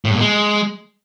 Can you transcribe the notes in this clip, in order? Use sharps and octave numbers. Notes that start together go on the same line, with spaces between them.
A2
G2
A#2
G#3